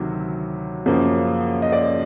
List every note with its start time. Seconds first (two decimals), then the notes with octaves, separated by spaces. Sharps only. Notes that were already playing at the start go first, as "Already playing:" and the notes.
Already playing: D2 C3 D#3 F#3
0.86 F#2 C#3 F3 A#3
1.62 D#5
1.72 D5